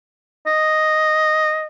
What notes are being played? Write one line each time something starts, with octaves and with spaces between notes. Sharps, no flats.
D#5